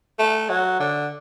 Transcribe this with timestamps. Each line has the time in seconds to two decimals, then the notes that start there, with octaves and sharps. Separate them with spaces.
0.19 A3
0.49 F#3
0.80 D3